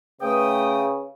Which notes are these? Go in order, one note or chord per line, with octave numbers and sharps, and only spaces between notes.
C#3 A3 B4 G5 D#6